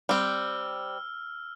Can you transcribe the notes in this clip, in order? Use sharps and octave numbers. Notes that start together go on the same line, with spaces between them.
G3 C4 E6 F6